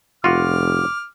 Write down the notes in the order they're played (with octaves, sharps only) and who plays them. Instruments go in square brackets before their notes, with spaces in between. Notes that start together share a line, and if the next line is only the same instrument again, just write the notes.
[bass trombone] F1 [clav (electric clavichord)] F4 F#4 [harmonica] D6 F6